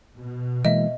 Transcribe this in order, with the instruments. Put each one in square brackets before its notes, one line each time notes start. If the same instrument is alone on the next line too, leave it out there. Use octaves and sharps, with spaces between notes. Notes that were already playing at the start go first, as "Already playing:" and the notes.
[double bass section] B2
[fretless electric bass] E3 G#3 A#3 [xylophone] D#5 E5